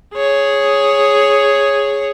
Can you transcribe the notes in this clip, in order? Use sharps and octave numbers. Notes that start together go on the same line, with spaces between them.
G#4 C#5